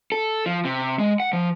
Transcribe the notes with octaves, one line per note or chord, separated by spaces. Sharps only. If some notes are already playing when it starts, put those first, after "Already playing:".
A4
F3
C3
G#3
F#5
F3